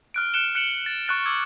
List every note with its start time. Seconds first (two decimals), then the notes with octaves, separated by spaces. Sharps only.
0.14 F6 F#6 D7
0.34 F#6 C#7 D7 E7 G7
0.55 F#6 C#7 D7 E7 F#7
0.86 A6
1.07 C#6 F#6 A6 E7
1.26 D6 E6 G#6